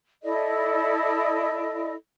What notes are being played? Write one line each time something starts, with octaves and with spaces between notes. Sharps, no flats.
E4 A4 D5 D#5